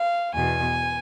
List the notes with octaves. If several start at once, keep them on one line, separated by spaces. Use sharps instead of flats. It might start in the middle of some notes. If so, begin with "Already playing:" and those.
Already playing: F5
E2 B2 G#5